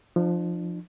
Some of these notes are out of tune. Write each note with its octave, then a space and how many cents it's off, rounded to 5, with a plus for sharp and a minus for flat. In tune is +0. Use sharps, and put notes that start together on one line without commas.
F3 +0 D4 +45